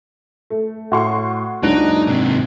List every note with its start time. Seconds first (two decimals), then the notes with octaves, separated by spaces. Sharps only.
0.50 A3
0.92 A2 F#4 C6 C#6
1.63 F#1 C#2 F#3 D4 D#4 F#6 D7
2.07 G#2 C3